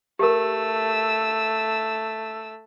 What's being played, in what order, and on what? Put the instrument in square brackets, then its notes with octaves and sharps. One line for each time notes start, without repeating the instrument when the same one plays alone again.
[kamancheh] A3 E6 [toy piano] G4 A#4